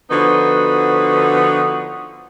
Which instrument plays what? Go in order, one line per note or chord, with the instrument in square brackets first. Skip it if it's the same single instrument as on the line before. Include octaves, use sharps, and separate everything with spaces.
[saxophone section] D3 F3 B3 D#4 F#4 B4